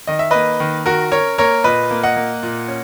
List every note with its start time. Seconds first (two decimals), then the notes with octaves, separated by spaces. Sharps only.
0.07 D#3 D#5
0.19 E5
0.31 A#3 B4 D#5
0.60 D#3
0.86 D#3 F#4 A#4
1.12 C#4 A#4 C#5
1.38 A#3 A#4 C#5
1.64 A#2 B4 D#5
1.91 A#3
2.03 D#5 F#5
2.16 A#3
2.43 A#2
2.68 C#4